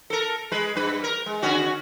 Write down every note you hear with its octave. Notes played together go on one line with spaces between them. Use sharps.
A4 A#4
G#3 B4
G2 B4
A#4
G#3
D3 C#4 F#4